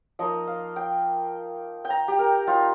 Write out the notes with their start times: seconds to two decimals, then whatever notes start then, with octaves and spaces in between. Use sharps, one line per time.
0.19 F3 A#3 D#4 D#5
0.47 F5
0.76 G5
1.85 G5
1.90 A#5
2.08 G4
2.19 A#4
2.47 G3 D#4 F4